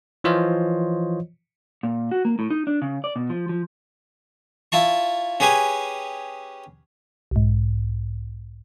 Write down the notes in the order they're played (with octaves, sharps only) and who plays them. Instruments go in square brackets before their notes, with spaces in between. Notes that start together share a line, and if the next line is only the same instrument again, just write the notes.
[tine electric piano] E3 F3 F4 C5 C#5 D#5
[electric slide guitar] A#2
F#4
A#3
A2
D#4
D4
C#3
D5
B2
F3
F3
[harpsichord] E4 F4 A5 C#6
C#4 G4 G#4 B4 G#5
[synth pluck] B1 G#2